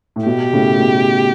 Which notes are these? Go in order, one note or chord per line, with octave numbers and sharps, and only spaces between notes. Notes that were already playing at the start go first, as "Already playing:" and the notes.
A2
B2 G4
A2 C#3
B2